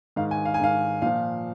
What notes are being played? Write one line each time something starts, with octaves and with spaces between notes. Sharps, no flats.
G#2 D#3 F5
G#5
F5
G#5
G#2 D#3 F5
A#2 F3 F5